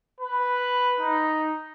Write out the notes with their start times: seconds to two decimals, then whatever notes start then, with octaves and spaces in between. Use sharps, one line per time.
0.20 B4
1.00 D#4